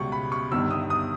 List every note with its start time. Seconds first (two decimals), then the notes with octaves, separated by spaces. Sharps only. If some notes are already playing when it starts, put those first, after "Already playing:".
Already playing: C#2 B2 G3 C#6
0.12 B5
0.32 C#6
0.51 G1 G2 D#3 E6
0.71 D#6
0.90 D#6